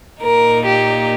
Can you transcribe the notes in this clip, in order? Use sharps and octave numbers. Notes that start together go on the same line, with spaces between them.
A#2 A#3 D#4 A#4
G4